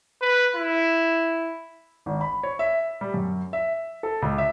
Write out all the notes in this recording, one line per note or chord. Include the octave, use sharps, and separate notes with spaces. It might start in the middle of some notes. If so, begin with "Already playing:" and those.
B4
E4
G#1
B5
C#5
E5
G3
F#2
E5
A4
C#2
E5